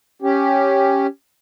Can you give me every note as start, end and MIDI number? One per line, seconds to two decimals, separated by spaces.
0.22 1.07 61
0.22 1.07 67